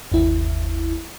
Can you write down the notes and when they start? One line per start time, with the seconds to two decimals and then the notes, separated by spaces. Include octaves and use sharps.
0.12 G1 D#2 E4